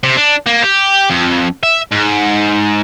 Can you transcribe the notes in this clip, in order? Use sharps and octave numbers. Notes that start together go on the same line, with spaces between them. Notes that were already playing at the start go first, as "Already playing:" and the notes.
C3
D4
A#3
G4
F2
E5
G#2